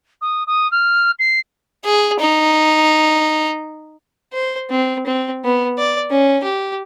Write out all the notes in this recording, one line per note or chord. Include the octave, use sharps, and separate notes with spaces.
D#6
D#6
F6
C7
G#4
D#4
C5
C4
C4
B3
D5
C#4
G4